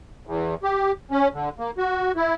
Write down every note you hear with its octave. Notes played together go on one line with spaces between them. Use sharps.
E2
G4
C#4
D3
A#3
F#4
E4